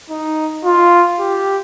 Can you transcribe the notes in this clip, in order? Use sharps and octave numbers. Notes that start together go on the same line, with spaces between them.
D#4
F4
G4